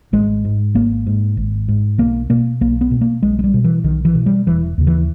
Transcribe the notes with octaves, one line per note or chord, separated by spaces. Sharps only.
G#1 G#3
G#2
G#1 A#3
G#2
G#1
G#2
B1 A#3
B2 A#3
B1 A#3
B3
B2
A#3
B1 G#3
G#3
G3
B2
E3
B1 D#3
E3
B2
G3
E1 E3
D#2 C#3
E3